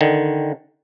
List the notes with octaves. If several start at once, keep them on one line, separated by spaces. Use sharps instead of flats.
D3 D#3